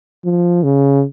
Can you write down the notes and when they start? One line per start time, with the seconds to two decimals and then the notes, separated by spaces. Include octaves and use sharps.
0.25 F3
0.63 C#3